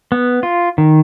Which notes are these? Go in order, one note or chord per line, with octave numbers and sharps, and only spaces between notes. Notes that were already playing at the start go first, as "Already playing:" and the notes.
B3
F4
D#3